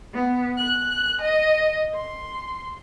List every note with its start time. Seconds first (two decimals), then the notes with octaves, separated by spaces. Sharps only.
0.13 B3
0.57 F#6
1.20 D#5
1.94 C6